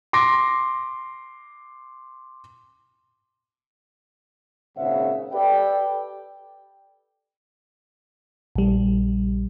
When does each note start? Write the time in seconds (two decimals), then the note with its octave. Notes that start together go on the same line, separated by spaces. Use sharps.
0.13 C6 D6 A#6
4.77 G#1 A#2 C#3 C5 E5 F#5
5.33 G4 A4 B4 D5 G5
8.56 A#1 G3